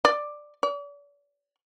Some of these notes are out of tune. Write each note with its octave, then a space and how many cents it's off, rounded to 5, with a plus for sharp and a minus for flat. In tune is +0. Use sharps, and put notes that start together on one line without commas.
D5 +10
D5 -40